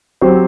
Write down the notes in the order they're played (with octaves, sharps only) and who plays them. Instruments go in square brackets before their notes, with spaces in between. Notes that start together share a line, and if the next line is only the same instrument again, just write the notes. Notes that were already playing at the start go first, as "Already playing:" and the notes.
[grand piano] F#3 C4 G4 C5